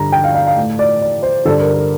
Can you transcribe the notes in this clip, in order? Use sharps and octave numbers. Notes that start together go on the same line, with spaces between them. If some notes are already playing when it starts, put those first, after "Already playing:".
Already playing: G2 D3 A#5
G5
F5
F5
F5
A2
D5
D5
C5
G2 D3 A4
A#4
A#4